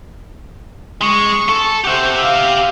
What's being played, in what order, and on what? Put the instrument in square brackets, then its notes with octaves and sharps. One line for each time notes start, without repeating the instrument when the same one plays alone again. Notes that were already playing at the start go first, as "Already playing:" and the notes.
[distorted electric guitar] G#3 [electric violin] C#6
[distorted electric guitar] A4
[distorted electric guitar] G4 E5 [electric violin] C5 F#5
[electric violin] F5